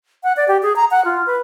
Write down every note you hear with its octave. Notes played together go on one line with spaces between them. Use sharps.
F#5
D5
G4
G#4
A#5
F#5
F4
B4